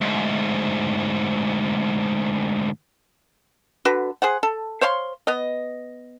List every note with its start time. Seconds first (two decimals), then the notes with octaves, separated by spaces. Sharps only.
0.01 D2 G#2
3.85 D3 F#4 B4
4.22 G#4 C5 F#5
4.43 A4
4.81 C5 C#5 F5 C6
5.27 B3 D#5